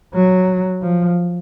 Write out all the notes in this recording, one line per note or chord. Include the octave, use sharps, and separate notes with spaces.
F#3
F3